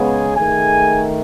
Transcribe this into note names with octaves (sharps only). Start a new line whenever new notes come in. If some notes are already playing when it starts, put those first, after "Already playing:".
Already playing: C#3 G#3 B3 G#4 G#5
D#3 A3 G#4 G#5